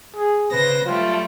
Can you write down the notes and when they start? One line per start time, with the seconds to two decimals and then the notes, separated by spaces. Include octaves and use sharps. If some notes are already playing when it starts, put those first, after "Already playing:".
0.17 G#4
0.52 C#3 B4 C5 A#6
0.86 F#3 G3 A3 F4